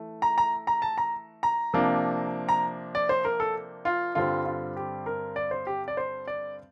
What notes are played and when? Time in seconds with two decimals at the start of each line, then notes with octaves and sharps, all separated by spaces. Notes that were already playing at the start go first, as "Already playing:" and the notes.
Already playing: E3 A3
0.22 A#5
0.38 A#5
0.67 A#5
0.82 A5
0.98 A#5
1.43 A#5
1.74 C3 F3 A#3 D4
2.49 A#5
2.95 D5
3.09 C5
3.25 A#4
3.40 A4
3.85 F4
4.15 G2 D3 G3 C4 F4
4.45 F4
4.76 G4
5.06 A#4
5.36 D5
5.51 C5
5.67 G4
5.88 D5
5.97 C5
6.27 D5